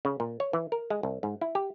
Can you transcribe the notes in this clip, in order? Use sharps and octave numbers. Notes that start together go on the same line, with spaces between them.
C#3
A#2
C#5
E3
A#4
G#3
C2
G#2
E4
G4